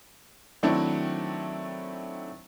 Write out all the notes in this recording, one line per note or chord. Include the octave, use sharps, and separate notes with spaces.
D#3 F#3 A3 C4 D4 E4